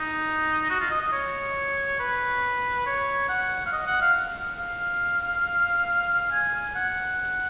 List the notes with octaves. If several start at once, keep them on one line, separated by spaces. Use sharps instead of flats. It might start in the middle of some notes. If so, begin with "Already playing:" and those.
Already playing: D#4
F#4
F4
D#5
D#5
C#5
B4
C#5
F#5
F5
D#5
F#5
F5
F5
G#5
F#5